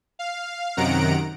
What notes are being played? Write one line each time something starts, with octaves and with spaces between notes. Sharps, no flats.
F5
F#2 C3 D#3 F#5 A#5 D7